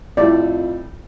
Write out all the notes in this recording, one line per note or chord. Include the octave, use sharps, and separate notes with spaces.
F2 A2 G3 D5